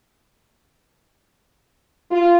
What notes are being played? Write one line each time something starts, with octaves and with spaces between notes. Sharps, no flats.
F4